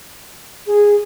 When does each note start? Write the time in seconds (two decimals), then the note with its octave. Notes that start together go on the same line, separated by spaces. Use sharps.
0.67 G#4